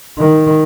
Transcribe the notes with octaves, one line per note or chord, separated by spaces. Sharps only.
D#3